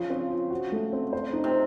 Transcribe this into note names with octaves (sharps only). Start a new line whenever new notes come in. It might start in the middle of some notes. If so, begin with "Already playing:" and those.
Already playing: C#3 F3
C4
F4
F#4
A3
C4
C5
D#4
C3